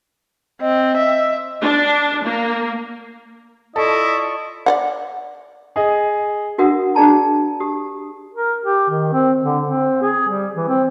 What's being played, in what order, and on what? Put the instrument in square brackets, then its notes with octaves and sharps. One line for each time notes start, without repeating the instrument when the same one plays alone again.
[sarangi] C4 [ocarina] D#5
[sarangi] E5
[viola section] D4
A#3
[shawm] E4 [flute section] F4 D5 C#6 [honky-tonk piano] A4 [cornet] D#5
[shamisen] D5 D#5 F#5
[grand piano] G#4 D#5
[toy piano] D4 F#4 A#4 E5 F#5 D#6
D4 G#4 D5 A5 A#5
G4 D#6
[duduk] A#4
G4
D#3
C4
D3
C4
G#4
G3
E3
C4